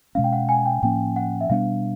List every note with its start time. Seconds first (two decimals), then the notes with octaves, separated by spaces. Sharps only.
0.15 B2 G#3 C#4 F5
0.24 G5
0.32 F#5
0.49 G#5
0.66 G5
0.83 A2 F3 A#3 C#4 G5
1.16 F#5
1.41 E5
1.50 B2 G3 B3 D4 F5